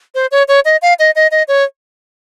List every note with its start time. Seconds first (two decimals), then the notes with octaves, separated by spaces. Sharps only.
0.15 C5
0.31 C#5
0.48 C#5
0.65 D#5
0.82 F5
0.99 D#5
1.16 D#5
1.31 D#5
1.48 C#5